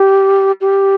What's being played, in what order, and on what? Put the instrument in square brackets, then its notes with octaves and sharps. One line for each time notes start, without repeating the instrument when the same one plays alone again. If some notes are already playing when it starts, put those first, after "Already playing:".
Already playing: [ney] G4
G4